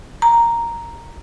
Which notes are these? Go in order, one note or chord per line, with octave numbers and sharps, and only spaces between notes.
A#5